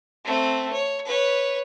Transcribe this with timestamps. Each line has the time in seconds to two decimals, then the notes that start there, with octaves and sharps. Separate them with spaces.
0.25 A3 C4
0.72 C#5
1.05 B4 C#5